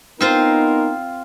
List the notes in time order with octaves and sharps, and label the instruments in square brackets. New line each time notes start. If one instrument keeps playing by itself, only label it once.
[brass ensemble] B3 D#4 A#4 [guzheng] C4 F4 C5